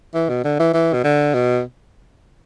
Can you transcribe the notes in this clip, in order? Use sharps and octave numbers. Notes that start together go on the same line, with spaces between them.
E3
B2
D3
E3
E3
B2
D3
B2